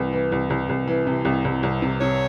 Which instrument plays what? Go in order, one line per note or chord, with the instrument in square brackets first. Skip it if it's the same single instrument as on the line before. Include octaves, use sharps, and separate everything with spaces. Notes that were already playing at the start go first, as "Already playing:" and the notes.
Already playing: [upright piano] C2 E3
E3
C2
C2
C2
E3
C3
C2
C2
C2
C3
[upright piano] C3 [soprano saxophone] C#5